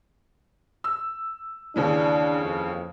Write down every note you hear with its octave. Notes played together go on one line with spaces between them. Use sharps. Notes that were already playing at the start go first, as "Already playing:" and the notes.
E6
D#2 C#3 E3 D4
F2